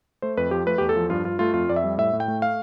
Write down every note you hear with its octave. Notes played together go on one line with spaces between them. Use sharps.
A3 C5
F2 B4
F3 G4
A3 B4
E2 G4
A4
F3
G2 F4
G2 F4
A3 F4
F2 F4
F2 D5
E5
G3
A2 E5
A2
G5
A3
F5